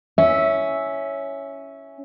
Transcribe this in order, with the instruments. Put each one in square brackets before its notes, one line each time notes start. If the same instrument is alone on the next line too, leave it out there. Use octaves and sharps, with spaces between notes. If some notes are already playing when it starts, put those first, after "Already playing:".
[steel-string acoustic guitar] C#4 [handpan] E5